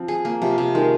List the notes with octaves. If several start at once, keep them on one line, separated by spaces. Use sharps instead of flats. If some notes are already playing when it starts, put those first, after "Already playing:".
Already playing: F3 C4
G#4
A#3
C3 F3
C3
D#3 G#3